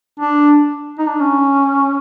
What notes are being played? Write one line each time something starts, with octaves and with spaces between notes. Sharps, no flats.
D4
D#4
D4
C#4